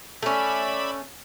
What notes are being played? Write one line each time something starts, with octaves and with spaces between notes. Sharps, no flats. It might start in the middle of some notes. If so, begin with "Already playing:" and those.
A3 C#4 D5 E5 B5